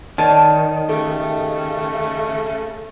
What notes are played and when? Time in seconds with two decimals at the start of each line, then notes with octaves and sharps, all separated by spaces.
0.18 D#3 C#5 D5 A5
0.89 C#3 A3 G4 A4